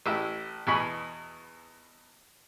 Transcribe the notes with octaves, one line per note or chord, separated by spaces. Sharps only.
A1 E4 E5
E2 B2 G#5 B5 C#6